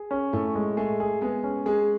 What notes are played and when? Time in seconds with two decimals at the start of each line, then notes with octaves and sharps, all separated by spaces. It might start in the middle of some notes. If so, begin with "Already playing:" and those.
Already playing: G#4
0.11 C#4
0.33 A2 A3
0.56 G#3
0.77 A3 G#4
1.00 G#4
1.21 G#3 B3 G#4
1.44 C#4
1.66 G#3 G#4